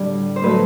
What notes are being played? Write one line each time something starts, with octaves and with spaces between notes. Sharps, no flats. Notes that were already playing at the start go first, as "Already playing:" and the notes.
Already playing: A2 D3 G3 A3
C5
A2 F#3 A3 B4